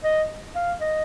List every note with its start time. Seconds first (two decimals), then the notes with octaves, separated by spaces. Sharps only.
0.04 D#5
0.55 F5
0.81 D#5